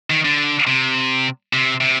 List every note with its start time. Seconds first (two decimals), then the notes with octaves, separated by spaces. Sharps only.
0.10 D#3
0.24 D3
0.67 C3
1.53 C3
1.81 C3